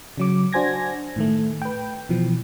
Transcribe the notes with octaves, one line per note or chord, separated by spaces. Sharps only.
C#3 F#3 D6
D4 F#4 C5 G#5 G#6 A#6
A2 D#3 A3
B4 G5
B2 E3 F3